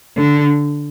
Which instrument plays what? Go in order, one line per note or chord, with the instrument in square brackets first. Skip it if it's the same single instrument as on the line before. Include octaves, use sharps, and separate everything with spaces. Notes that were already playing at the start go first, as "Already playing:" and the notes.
[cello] D3